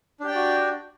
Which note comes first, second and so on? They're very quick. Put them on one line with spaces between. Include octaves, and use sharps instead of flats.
D4 G4 G5 D5 F#4